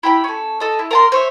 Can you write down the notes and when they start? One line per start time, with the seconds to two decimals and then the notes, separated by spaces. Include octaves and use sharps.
0.03 E4 G4 G5 B5
0.24 C#4 A4
0.60 A4 D#5
0.79 E4
0.91 A#4 A5 C6
1.12 C5 C#5 E5